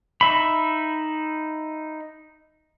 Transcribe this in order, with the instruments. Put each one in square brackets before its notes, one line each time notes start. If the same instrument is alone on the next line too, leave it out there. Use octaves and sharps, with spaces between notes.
[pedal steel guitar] D#4 E5 B5